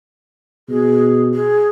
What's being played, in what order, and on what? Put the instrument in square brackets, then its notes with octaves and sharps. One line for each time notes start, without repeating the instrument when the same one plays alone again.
[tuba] B2 [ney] G#4
[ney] G#4